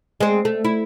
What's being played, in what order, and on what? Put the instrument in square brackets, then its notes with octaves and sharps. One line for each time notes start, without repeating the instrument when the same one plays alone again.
[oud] G#3 C4
A3
E4